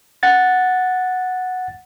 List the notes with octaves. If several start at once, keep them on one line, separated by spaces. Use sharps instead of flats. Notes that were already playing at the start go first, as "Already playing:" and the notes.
F#5 A6